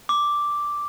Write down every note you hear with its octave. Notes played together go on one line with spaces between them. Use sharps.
D6